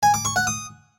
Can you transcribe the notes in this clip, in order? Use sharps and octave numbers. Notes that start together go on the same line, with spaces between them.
G#5
D6
C#6
F#5
D#6